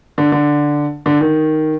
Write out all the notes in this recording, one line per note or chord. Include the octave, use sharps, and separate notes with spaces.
D3
D3
D3
D#3